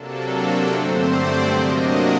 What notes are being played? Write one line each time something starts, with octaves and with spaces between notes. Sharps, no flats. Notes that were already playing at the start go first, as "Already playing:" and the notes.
Already playing: C3 F#3 A#3 D4 A4
G2 D3 A3 C4 C5
D5
C3 F#3 A#3 D4 D#5
F#5